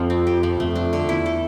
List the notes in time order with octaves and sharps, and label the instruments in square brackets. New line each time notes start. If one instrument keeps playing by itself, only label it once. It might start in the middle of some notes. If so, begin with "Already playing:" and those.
Already playing: [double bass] F2 [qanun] F3 F4
[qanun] C4
G4
F3
[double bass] F2 [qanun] A3
[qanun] D4
D3
[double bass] E2 [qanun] E4
[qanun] A4